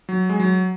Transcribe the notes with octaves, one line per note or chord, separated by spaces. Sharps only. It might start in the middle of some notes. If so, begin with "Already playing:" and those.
F#3
G#3
F#3